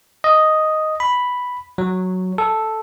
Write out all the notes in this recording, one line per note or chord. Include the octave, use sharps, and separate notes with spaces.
D#5
B5
F#3
A4